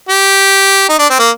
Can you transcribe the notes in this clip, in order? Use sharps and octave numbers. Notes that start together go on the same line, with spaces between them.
G4
D#4
D4
C4
A#3